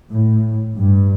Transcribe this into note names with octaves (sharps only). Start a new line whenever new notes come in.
A2
G2